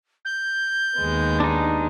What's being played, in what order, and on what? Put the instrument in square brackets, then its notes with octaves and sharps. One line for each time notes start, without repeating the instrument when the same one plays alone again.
[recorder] G6
[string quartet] D#2 G#3 B3
[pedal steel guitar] D4 D#4